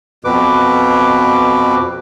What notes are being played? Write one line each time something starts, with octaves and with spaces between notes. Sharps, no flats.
F2 B2 B4 D6